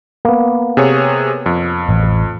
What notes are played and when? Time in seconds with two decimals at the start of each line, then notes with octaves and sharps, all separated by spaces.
0.25 A#3 B3
0.77 C3 G#4 C#5
1.46 F2
1.89 A1